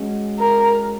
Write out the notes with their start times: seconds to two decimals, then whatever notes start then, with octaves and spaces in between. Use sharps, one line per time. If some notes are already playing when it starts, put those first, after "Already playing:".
Already playing: G#3 C#4 F#4
0.39 A#4